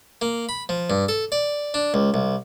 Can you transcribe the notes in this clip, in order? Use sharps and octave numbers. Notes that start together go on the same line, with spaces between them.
A#3
B5
F3
G2
A4
D5
D4
C#2
C2